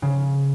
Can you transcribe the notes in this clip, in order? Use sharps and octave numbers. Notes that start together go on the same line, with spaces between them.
C#3